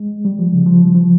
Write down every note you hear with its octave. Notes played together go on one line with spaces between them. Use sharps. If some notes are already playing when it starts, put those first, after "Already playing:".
Already playing: G#3
G3
F3
C#3
F3
F3